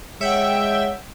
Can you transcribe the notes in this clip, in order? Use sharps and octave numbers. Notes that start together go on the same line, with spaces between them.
G#3 C#5 E5 F#5 G5